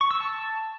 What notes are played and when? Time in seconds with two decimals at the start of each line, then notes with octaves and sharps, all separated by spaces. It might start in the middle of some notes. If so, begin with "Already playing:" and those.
0.01 C#6
0.11 E6
0.20 A5